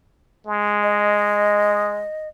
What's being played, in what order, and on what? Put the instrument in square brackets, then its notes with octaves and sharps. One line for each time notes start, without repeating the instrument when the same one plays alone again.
[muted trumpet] G#3
[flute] D#5